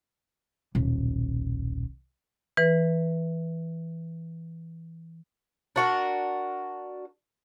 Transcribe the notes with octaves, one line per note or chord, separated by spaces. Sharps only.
D#1 B1
E3 B4
D4 F#4 A#4